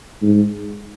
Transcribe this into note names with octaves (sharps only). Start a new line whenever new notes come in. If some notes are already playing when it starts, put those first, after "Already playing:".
G#2